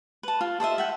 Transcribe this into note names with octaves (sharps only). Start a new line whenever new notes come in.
B4 A5
F4
A4 C5 D#5 E5
E5 F#5 G5